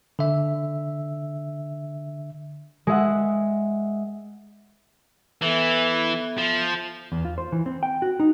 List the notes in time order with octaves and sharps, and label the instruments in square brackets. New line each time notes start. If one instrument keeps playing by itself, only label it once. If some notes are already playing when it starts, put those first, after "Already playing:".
[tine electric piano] D3 E5
[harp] G#3 G#4 E5 F#5
[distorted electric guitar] E3 [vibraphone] B3 A4 E5
[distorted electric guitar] F3
[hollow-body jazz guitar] E2
F4
C5
E3
C4
G5
F#4
D#4